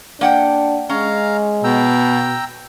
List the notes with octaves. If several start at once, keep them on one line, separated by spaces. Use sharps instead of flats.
A#3 D4 F#5 G5
G#3 C#4 F5 A#5
B2 G5 A#5 E6